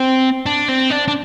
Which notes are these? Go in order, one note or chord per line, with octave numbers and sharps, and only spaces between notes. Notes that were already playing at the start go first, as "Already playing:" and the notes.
Already playing: C4
D4
C4
D4
D4